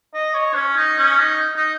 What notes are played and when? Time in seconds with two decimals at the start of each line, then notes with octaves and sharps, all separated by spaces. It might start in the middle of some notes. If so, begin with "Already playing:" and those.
0.14 D#5
0.34 C#5
0.55 C#4
0.77 D#4
0.98 C#4
1.19 D#4
1.56 D#4